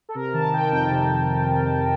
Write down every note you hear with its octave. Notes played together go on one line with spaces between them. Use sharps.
A4
C3 A#4
D#3 A5
D#3 G5
F2 G5
C3